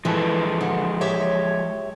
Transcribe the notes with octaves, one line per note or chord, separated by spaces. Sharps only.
E3 F3 G#3 A4
D3
G4 C#5 E5